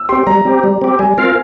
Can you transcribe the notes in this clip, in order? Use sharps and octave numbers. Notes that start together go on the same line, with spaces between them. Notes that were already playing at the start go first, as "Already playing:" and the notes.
Already playing: E6
C4 G4 C6
G3 A#5
C4 G4
G3
C4 G4
G3 G#5
C4 F4 A#4 F5